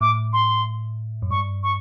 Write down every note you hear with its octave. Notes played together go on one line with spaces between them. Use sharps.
A2 D6
C6
F#2
G2 C#6
C#6